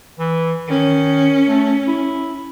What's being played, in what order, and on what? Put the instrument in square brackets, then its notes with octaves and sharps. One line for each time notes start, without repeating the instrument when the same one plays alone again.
[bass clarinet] E3
[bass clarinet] D#3 [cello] C#4
[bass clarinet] A3
E4